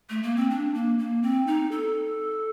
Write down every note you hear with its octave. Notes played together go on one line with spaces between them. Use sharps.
A3
A#3
C4
D4
A#3
A#3
C4
D#4
A4